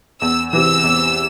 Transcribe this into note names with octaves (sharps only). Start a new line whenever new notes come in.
E2 E6
C3 E3 E6
E2